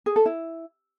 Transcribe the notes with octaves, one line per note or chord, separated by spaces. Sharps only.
G#4
A4
E4